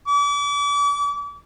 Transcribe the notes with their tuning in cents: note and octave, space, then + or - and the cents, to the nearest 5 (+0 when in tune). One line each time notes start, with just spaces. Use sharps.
D6 -35